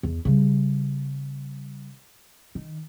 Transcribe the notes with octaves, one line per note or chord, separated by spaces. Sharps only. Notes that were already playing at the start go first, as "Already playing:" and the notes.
E2
C#3 G3
D#3